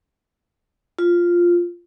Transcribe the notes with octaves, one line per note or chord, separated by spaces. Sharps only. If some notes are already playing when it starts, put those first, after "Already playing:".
F4